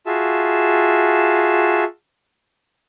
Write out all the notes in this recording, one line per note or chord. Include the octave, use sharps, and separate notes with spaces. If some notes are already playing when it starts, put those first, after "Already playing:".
F4 F#4 G#4 E5 A5